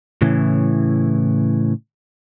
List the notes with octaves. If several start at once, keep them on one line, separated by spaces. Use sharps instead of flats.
A2 C#3 E3